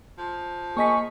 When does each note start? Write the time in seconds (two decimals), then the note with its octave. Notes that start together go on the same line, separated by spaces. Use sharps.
0.18 F3
0.77 A#3 G#4 D#5 C#6 B6